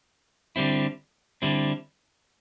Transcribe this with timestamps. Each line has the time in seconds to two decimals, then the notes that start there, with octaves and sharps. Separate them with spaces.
0.56 D3 G3 C4 E4
1.42 D3 G3 C4 E4